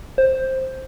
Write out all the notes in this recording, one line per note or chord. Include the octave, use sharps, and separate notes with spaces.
C5